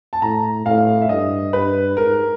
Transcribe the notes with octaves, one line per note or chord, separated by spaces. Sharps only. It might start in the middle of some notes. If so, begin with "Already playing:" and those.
A5
A2 A#5
A2 F5
E5
G2 D#5
G2 B4
G#2 A#4